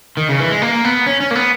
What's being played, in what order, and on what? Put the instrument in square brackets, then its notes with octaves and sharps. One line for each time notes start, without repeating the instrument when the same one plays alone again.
[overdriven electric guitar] D#3
C#3
E3
G#3
A#3
B3
C#4
C#4
A#3
B3